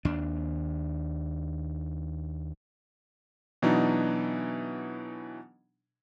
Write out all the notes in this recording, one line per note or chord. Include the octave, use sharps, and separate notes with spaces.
D#2 D4
B2 E3 F#3 B3 D4 D#4